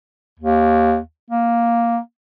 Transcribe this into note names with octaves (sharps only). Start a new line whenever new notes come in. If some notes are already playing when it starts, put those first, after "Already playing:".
D#2
A#3